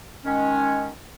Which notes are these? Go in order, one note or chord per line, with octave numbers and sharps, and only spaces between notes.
D#3 G#3 C#4